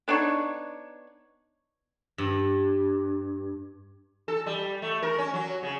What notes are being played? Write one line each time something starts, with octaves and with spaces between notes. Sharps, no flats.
B3 D4 D#4 C#5
G2
A4
G3
A3
A#4
C#4
F#3
C#3